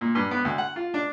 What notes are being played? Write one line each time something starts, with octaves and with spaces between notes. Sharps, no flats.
A#2
G2
B3
D2
F#5
F4
D4